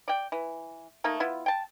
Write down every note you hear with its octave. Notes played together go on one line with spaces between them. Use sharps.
D5 G5
E3
A3 A#3 D#4
B3 E4 F4
G5 A5